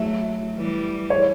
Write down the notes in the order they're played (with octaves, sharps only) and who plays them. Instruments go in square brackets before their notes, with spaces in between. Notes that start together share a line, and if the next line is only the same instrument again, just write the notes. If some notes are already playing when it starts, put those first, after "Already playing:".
Already playing: [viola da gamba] F#3 A3 [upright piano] E5
[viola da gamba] E3 G3
[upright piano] C#5